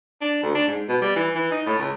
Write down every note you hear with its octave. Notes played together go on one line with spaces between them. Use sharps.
D4
D2
D4
G#2
B2
G3
E3
E3
D#4
A2
C#2